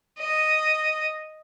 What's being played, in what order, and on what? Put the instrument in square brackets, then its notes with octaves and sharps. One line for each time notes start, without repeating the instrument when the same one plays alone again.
[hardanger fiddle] D#5